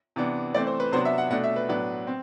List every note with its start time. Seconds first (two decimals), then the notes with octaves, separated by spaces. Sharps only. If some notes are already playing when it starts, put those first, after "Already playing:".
0.16 C3 E3 B3 D4
0.54 E3 A3 C4 D5
0.67 C5
0.80 B4
0.92 C3 F#3 B3 D4 C5
1.05 E5
1.18 F#5
1.30 B2 A3 D4 F#5
1.44 E5
1.56 B4
1.69 A2 F#3 B3 D4 B4
2.07 C4